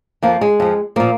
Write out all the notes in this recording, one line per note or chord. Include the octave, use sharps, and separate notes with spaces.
F2 F3 A#3
G#3
F2 F3
A#2 F3 A#3